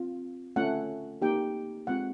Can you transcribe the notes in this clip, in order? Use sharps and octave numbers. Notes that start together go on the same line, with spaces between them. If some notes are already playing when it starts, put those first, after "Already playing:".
Already playing: C4 F4
A3 C#4 F4 F#5
A#3 D#4 G4 G5
G#3 C4 F4 F#5